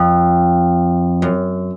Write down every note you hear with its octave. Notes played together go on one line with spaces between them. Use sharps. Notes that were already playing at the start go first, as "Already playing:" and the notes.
Already playing: F2
F#2